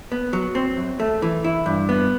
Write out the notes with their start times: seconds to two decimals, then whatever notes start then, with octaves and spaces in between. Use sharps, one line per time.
0.12 B3
0.33 F#3
0.55 C4
0.77 F#2
1.00 A3
1.22 E3
1.44 E4
1.66 G2
1.89 B3